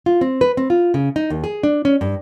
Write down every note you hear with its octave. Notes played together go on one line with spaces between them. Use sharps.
F4
C4
B4
C4
F4
C#3
D#4
D#2
G#4
D4
C#4
G2